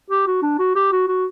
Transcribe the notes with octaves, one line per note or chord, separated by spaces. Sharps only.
G4
F#4
D4
F#4
G4
F#4
F#4